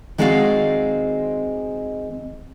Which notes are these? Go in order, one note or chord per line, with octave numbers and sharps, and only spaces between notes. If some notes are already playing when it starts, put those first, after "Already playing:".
D#3 G#3 C4 F#4 D5 F5